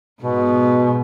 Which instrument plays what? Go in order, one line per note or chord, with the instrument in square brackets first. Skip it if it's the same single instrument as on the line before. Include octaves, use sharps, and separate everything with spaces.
[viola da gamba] G#2 B3 [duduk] B2